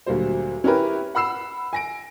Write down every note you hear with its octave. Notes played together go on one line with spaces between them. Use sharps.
D2 A#2 F#3 G3 C5
C#4 E4 G4 A#4 B4
F#5 B5 E6 C7 E7
G#5 A#6 D7